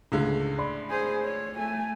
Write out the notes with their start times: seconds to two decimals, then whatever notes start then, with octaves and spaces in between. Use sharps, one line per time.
0.12 C#2 A2 D3 G#3
0.58 D5 B5 C6
0.90 G#4 C5
1.24 C#5
1.57 A3 G#5